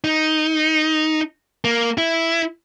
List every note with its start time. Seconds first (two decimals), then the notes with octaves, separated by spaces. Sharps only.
0.04 D#4
1.64 A#3
1.98 E4